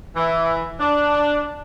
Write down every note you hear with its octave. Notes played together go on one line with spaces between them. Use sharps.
E3
D4